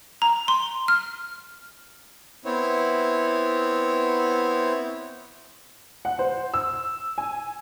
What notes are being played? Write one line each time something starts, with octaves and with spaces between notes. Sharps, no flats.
A#5
C6
F6
B3 C4 E4 C#5
F#5
C5
E6
G#5